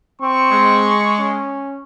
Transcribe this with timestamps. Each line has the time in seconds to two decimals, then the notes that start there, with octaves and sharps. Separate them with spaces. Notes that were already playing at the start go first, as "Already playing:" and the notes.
0.21 C4 C#6
0.51 G#3
1.19 C#4